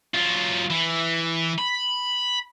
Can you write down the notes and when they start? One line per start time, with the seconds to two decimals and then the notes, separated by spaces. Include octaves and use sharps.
0.14 F#3 F4
0.70 E3
1.59 B5